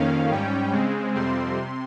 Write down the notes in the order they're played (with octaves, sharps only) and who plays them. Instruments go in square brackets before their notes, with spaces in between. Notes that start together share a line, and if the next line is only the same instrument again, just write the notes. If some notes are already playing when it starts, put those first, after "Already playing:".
Already playing: [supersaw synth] F2 D#3 A#3 C#4 F5
G#2 G3 C#4 G5
C#3 G#3 C4
F2 C3 G3 C4 C6
C3